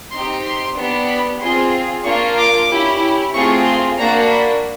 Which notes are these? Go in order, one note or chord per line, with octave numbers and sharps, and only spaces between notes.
C4 D#4 G4 C6
C6
B3 D4 G4
B5
C4 F4 G#4 C6
A#3 D4 F4 C#6
D6
C#4 E4 G4
A3 C4 F4 G#4 C#6
C6
A#3 D4 F#4 A#5
B5